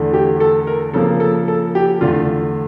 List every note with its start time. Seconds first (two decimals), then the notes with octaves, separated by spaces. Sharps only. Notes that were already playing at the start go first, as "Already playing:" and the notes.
Already playing: E2 D3 A3
0.13 G4
0.40 A4
0.67 A#4
0.94 C#3 F3 A#3 A4
1.20 A4
1.48 A4
1.75 G4
2.01 E2 D3 A3 F4